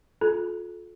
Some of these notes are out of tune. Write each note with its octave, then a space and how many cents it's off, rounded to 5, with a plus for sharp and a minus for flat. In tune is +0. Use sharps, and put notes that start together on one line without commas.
F4 +30 A4 -30